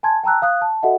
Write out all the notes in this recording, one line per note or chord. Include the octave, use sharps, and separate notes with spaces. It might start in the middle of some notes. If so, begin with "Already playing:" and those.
G#5 A5 C6 G#6
G5 A5 A#5 E6 F#6
F5 D#6 F#6
A5
F#4 A4 D#5 E5 F#5